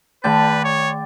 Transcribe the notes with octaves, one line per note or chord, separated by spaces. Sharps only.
D#3 A3 B4 D5 G5 A5 A6
C#5